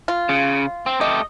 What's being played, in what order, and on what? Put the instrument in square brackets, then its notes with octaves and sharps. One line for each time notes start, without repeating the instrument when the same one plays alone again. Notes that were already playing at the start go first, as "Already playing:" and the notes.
[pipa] F4
[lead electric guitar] C#3
C4
[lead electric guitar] A3 G4 [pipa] D#5